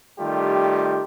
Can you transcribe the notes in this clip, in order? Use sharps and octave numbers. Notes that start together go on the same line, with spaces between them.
D#3 G3 A3 F4 G4